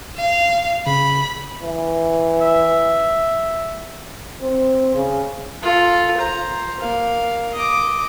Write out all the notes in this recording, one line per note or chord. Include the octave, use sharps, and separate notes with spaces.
F5
C#3 B5
E3
E5
C4
C#3
F4 A4
C5 A#5
A#3 F5
D#5 D6